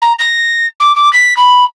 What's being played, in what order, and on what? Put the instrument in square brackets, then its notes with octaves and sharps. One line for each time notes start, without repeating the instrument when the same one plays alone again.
[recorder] A#5
A#6
D6
D6
B6
B5